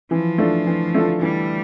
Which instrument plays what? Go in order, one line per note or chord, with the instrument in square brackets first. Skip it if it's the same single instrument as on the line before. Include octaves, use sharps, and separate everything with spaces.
[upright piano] E3 [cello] F3
[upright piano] A3 D4 F4 A4
E3
A3 D4 F4 A4
[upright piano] E3 [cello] G3